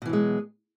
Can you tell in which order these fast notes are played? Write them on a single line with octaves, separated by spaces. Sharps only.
B2 E3 F#3 G#3